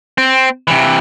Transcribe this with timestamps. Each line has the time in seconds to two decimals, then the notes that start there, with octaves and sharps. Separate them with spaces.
0.18 C4
0.68 C3 E3